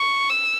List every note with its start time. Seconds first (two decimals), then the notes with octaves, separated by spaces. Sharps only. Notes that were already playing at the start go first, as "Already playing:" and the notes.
Already playing: C#6
0.29 E6